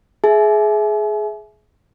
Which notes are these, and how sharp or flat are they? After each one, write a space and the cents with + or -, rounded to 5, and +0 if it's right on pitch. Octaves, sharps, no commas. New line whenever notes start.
G#4 +20 E5 +0 G#5 +40